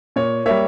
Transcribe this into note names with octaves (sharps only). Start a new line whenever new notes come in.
A#2 C#5
G3 A#3 C#5 E5